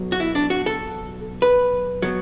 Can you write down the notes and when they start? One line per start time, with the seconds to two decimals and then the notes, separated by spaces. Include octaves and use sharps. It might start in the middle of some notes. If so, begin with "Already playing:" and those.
Already playing: B1 B2 F#3
0.12 F#4
0.20 E4
0.35 D4
0.50 F#4
0.66 A4
1.42 B4
2.02 B2 F#3